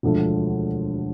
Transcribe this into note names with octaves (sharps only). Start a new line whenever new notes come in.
E1 D2 D3 F3 A3